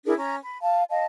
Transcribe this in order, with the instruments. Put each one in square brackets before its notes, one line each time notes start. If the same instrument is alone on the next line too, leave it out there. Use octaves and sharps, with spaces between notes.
[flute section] D4 E4 G#4 A#4
C#4 A#5
B5
F5 A5
D#5 F5 A5